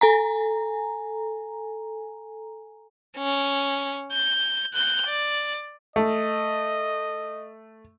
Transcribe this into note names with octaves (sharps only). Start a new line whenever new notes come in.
A4 G#5 A#5
C#4
G6
F#6 G6
D5
A3 D#5